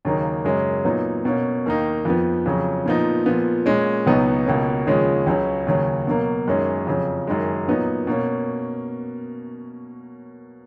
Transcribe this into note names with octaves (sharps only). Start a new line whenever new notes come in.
D#2 C#3 F#3 A#3 D#4
F#2 C#3 G#3 C#4
A#2 F#3 B3 D#4
B2 A#3 C#4
D#2 D#3 A#3 D#4
F2 F3 B3
F2 C#3 F#3 C#4
A#2 F3 B3 D#4
A#2 F3 B3
A#2 G#3 C#4
C#2 B2 F#3 B3 D#4
C#2 B2 A#3 C#4
D#2 C#3 F3 G#3 C#4
C#2 C#3 F#3 C#4
D#2 C#3 F#3
B2 F#3 A#3
F#2 D#3 G#3 C#4
F2 C#3 F#3
F#2 D#3 G#3
A#2 F#3 B3 D#4
B2 A#3 C#4